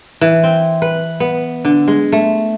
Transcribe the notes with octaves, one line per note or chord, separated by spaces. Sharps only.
E3
C4
B4
B3
D3
G#3
A3